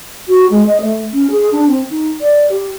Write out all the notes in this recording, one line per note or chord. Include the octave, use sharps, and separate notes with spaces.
F#4
G#3
D#5
A3
C#4
G#4
D4
C4
D#4
D5
G4